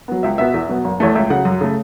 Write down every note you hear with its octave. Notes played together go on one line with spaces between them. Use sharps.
F#3 B3
C#2 E5
B2 B3 E5
E2
B2 F#3 B3
F#1
E2 E3 A3 C#5
C#2 E5
C#3 F#3 F#5
F#2
C#3 A3